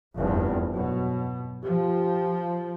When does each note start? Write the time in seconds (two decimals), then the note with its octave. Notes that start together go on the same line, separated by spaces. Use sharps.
0.15 F1 E2 G2
0.75 B2 F#3
1.65 F3 G4